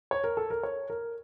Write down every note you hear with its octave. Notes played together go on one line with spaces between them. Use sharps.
C#5
A#4
A4
A#4
C#5
A#4